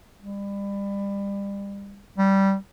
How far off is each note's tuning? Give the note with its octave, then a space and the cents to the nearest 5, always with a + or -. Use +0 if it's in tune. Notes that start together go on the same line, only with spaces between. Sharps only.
G3 +30
G3 -10